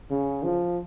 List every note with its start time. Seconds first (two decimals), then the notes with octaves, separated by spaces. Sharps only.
0.10 C#3
0.43 F3